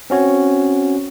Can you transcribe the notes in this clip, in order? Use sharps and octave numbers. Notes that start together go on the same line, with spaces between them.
C4 C#4 F#4 C#5